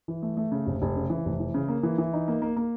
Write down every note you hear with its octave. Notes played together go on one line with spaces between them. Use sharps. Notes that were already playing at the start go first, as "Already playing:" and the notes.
E3
A3
A3
C#3
F1
F1
C#3
E3
F1
E3
C#3
A#3
E3
E3
D#4
A#3
A#3
A#3